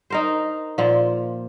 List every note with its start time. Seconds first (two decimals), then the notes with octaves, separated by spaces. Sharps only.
0.10 D#4 A#4 C5
0.78 A#2 F3